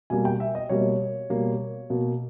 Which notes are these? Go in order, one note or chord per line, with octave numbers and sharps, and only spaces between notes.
B2 G3 A#3 G#5
G5
E5
D#5
B2 G3 A#3 C#5
B2 G3 A#3
B2 A#3